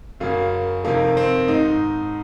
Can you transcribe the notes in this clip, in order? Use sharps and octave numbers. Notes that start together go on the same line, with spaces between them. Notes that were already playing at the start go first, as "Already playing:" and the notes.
F#2 C#3 A#3
F2 C3 D#3 A#3
C4
G#2 D#3 D#4